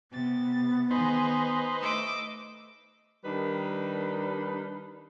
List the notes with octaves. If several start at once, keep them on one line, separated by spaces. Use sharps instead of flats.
C3 B3 A6
D#3 D#4 G#4 B4 C5
A3 D#5 D6 E6
D#3 G3 D4 D#4 A#4 B4